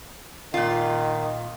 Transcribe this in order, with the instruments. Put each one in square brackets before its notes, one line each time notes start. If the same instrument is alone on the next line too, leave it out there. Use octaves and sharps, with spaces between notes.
[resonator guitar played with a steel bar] A#2 F4 [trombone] D#3